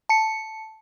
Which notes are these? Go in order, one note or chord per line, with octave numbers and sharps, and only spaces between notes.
A5 C#7